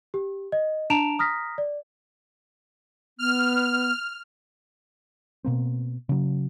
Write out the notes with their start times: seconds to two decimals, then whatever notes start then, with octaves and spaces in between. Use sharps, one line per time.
0.14 G4
0.52 D#5
0.90 D4 A5 A#5 D7 E7 F7
1.19 A#5 D#6 F6 A#6 B6
1.58 D5
3.19 B3 F6
5.45 B2 A#3 C4
6.09 C#3 F#3